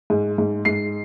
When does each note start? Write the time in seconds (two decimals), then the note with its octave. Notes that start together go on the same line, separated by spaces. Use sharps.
0.10 G#2
0.38 G#2
0.65 G#2 C7